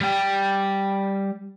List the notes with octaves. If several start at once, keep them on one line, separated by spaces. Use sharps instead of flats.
G3 G5